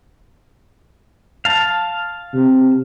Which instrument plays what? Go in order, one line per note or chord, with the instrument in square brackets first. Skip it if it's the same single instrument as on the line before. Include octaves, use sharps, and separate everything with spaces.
[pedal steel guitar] F5 A5
[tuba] C3